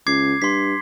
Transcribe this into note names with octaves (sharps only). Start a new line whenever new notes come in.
C#2 D6 G#6 C7
G2 C6 B6